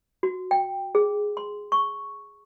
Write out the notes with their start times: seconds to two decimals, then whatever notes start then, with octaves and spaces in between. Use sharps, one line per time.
0.23 F#4
0.51 G5
0.95 G#4
1.37 C6
1.72 C#6